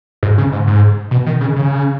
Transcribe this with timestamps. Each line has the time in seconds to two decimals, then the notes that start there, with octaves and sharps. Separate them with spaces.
0.23 G#2
0.38 C#3
0.52 G#2
0.67 G#2
1.11 B2
1.26 D#3
1.41 C#3
1.56 C#3